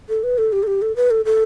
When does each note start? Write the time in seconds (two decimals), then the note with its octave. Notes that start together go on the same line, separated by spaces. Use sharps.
0.09 A4
0.23 B4
0.38 A4
0.52 G4
0.63 A4
0.67 G4
0.82 A4
0.96 B4
1.11 A4
1.25 A4